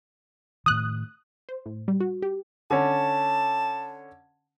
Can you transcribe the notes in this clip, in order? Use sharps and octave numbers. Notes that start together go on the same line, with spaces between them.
A2 D#3 D#6 F#6
C5
A2
G3
F#4
G4
D3 C#4 A5